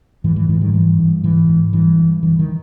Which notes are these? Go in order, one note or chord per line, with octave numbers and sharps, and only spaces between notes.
G#2 E3
E3 G#3
G#2 E3 G#3
D#3 G3
G2 E3
G2
G#2 E3
G#2
G2 E3
G2
G2 E3
D#3